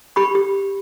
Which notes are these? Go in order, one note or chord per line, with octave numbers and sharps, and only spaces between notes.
G4 B5 C#6
G4